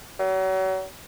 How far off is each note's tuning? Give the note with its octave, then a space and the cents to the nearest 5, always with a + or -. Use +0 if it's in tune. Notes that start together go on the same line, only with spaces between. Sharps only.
F#3 +35